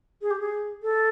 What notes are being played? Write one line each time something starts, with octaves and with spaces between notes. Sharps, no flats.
G#4
G4
G#4
A4